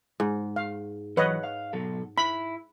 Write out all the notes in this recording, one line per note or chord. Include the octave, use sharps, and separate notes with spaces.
G#2
F5
E3 F#3 B4 C#5 D#5 F#5
F5
B2 F#3 A4
E4 B5